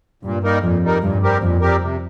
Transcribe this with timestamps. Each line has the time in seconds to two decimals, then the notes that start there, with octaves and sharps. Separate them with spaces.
0.23 G2 A#2
0.43 G3 A#3 D#4 A#4
0.62 F2 A#2
0.83 G3 A#3 D#4 A#4
1.02 G2 A#2
1.21 G3 C4 G4 A#4
1.41 F2 A#2
1.61 G3 C4 G4 A#4
1.81 C3